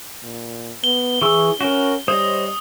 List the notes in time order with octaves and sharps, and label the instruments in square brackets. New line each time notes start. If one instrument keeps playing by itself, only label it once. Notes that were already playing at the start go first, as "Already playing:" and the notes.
[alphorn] A#2
[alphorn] B3 [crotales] G7
[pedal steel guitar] E3 C#6 E6 [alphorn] G#4
[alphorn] C#4 [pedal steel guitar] F#4 A#4
[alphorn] G3 [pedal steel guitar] C5 C#5 D#5 [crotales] D#6